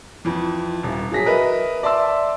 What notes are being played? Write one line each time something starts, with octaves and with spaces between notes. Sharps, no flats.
F2 E3
D#1
F#3 G#4 A#6 B6
A#4 B4 D#5 E5
D5 E5 A5 C6 E6